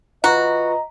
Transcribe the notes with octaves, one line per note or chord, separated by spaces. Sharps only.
F4 F#4 B4 D#5 A#5